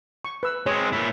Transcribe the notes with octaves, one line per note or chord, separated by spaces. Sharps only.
C#6
B4 E6
G#3 C4 C#5
A#2 E4